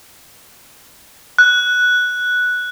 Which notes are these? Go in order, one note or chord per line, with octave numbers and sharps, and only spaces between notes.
F#6